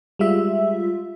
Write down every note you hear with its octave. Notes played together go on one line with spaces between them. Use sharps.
G3 G#3 F4 E5